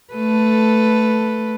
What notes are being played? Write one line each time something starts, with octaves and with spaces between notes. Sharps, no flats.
A3 A4 B4